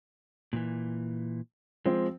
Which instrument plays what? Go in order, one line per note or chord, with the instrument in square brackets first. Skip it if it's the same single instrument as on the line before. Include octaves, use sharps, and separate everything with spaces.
[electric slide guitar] A#2 D#3 E3
[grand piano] F3 C4 [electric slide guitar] G#3